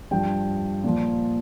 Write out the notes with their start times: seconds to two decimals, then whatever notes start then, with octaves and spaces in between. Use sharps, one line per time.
0.11 G2 F3 G5
0.84 A#2 F3